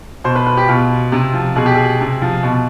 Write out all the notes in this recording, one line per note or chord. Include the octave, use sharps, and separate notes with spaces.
B2 C5
B4
B4
G4
B2 F4
C3
F3
B2 G#4
G4
G#4
C3
F3
B2